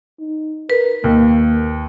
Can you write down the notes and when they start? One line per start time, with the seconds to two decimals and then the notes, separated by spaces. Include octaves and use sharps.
0.19 D#4
0.70 A#4 B4
1.04 D#2 A#3